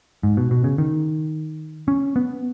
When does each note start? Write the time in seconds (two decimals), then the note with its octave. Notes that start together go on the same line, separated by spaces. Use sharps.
0.23 G#2
0.37 B2
0.51 B2
0.64 C#3
0.78 D#3
1.88 C#4
2.16 B3